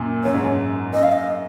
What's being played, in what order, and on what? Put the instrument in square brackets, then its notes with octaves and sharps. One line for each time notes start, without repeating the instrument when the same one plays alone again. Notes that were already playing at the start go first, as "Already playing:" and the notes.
Already playing: [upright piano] F#2 A#2
[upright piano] F#2 [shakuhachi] C#5
[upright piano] G#2
F#2
[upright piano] F#2 [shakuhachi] D#5
[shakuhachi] F5
D#5